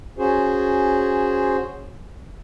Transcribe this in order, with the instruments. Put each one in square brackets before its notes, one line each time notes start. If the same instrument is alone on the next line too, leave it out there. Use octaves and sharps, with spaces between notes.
[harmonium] C#4 F#4 G#4 C5